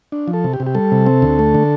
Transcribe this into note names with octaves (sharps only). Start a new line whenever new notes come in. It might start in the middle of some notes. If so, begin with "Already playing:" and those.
D4
F3
A4
C3
G4
C3
G4
G3 A4
C3
C4
D2
A3
D3